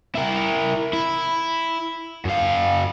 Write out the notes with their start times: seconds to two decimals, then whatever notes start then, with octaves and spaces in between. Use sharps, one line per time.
0.15 E4 A#4
0.93 E4
2.25 F#2 F5